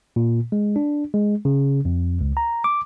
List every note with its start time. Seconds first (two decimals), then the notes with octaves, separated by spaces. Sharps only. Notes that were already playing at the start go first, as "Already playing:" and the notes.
0.16 A#2
0.52 G#3
0.76 D4
1.14 G#3
1.45 C#3
1.85 F2
2.21 C#2
2.37 A#5
2.64 D6